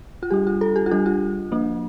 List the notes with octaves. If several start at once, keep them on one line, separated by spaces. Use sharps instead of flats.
F4
G3 D4 G4
F4
A4
G4
F4
G3 D4 G4
F4
F3 A#3 D4